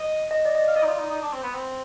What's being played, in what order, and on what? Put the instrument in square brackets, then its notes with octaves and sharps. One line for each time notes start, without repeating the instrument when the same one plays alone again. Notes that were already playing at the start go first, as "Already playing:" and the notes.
Already playing: [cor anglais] D#5
[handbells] D#5
D5
D#5
D5
[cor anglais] F5
[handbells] D5 [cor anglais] D#5
[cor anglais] D#4
F4
D#4
D#4
D4
C4
B3
C4